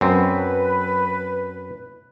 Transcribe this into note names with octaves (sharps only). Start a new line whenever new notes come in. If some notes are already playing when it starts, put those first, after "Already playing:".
F#2 C4 B4